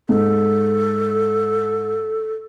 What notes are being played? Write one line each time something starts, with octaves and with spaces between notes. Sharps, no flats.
G#2 A4